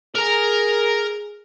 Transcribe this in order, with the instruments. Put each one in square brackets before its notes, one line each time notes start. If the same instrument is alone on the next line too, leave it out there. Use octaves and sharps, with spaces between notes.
[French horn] G#4 [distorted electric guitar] A#4 A#5